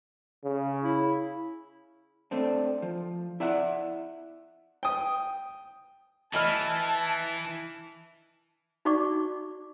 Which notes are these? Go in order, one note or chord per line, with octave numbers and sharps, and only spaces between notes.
C#3
E4
A3 C4 D4
F3
E4 D5 E5 F#5
G5 D#6
E3 D#5 A5 B5 F6
D#4 F#4 D5 C#6 D6